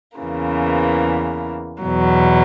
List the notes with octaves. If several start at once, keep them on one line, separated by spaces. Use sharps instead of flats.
E2 C#3 E3 A#3
E2 B2 F#3